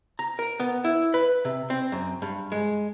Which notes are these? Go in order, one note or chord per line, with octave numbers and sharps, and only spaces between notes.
A#5
A#4
B3
E4
B4
C3
C4
F#2
G2
G#3